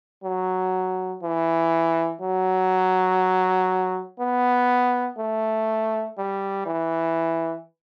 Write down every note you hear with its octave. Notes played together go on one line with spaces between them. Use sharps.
F#3
E3
F#3
B3
A3
G3
E3